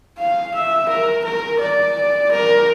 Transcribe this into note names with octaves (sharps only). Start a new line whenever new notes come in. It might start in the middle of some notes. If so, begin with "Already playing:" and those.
F5
E5
A#4
A#4
D5
A#4